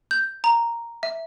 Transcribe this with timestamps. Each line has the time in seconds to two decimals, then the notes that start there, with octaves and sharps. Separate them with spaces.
0.11 G6
0.44 A#5
1.03 E5